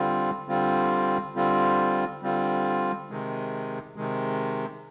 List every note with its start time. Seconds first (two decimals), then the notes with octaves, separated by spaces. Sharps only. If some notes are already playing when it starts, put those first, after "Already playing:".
Already playing: D3 G3 C4 F4
0.48 D3 G3 C4 F4
1.35 D3 G3 C4 F4
2.23 D3 G3 C4 F4
3.09 C3 D#3 G#3
3.96 C3 D#3 G#3